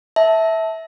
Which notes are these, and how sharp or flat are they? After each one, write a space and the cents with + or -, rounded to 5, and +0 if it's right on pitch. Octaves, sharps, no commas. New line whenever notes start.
E5 -15 A5 +0